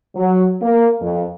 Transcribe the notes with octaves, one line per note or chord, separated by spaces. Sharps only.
F#3
A#3
F2